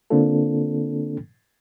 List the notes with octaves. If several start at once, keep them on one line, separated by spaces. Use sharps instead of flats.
D3 A#3 C4 D4 F4 A4